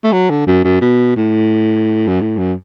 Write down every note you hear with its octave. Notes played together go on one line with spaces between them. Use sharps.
A3
F#3
D3
F#2
F#2
B2
A2
F#2
A2
F#2